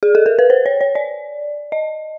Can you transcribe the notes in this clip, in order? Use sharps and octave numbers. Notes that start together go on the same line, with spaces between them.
G#4
A4
A#4
B4
C5
C#5
C#5
D5
D#5